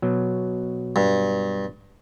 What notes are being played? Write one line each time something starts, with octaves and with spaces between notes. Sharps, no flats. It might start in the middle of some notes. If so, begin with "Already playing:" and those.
B2 F#3
G2